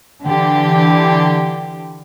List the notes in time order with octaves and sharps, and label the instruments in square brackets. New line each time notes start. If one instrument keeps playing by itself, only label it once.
[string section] D3 E3 G4